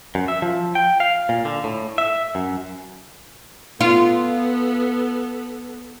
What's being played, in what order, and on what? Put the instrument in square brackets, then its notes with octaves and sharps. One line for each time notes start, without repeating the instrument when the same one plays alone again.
[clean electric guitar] F#2
E5
F3
G5
F5
A#2
D3
A2
E5
F#2
[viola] B3 A4 [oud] F4